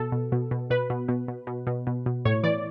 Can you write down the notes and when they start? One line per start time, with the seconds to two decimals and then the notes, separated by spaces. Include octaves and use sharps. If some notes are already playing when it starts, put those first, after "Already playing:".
Already playing: B2 A4
0.12 B2
0.32 B2
0.51 B2
0.70 B2 B4
0.90 B2
1.08 B2
1.28 B2
1.47 B2
1.67 B2
1.87 B2
2.06 B2
2.25 A2 C#5
2.44 E3 D5